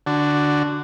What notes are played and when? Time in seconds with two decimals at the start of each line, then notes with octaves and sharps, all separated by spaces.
0.06 D3 D4 F#4